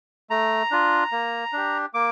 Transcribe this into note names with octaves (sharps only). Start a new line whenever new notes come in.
A3 A#5
D4 F4
A#3
D4 G4
A#3 D6